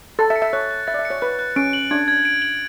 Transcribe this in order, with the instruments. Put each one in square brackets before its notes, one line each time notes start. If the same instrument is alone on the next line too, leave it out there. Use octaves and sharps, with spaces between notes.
[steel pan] A4 [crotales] A6
[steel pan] E5
[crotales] C#7
[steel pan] E5
[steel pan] C#5 [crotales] F#6
[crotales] F#6
[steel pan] E5 [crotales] A6
[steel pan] D5
E5
[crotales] C#7
[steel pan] C#5
[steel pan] B4 [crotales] F#6
[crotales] F#6
[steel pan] C#4 [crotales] D7
[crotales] F#7
[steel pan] D4 [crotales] G#6
[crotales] G#6
D7
F#7